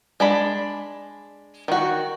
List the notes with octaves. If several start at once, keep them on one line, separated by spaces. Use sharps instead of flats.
G#3 D4 B5
D#3 F#4